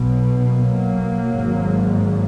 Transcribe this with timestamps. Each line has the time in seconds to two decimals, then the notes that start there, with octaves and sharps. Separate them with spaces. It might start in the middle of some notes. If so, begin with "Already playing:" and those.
Already playing: B1 B2
0.48 F#3 A#3
1.32 G#1 G#2